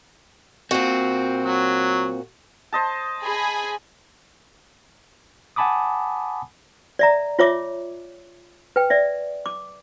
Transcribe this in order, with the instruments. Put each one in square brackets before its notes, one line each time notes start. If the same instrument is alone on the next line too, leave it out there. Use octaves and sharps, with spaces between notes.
[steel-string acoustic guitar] A#2 F#4 [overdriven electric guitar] C4
[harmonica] F#3
[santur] C5 D#5 A5
[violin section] G#4 G#5 B5
[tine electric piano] F#5 G#5 A5 B5 D6 D#6
[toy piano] D5 E5 A#5
F4 C#5 E5 D6
B4 G5
D5 E5
D6